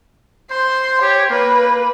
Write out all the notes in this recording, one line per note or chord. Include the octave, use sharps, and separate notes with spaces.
C5 C6
G4 C#5
A#3 B4